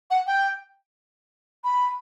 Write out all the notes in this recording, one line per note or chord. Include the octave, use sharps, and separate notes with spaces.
F#5
G5
B5